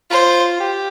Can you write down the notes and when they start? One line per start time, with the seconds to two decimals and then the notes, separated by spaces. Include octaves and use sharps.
0.11 F4 C5
0.60 G4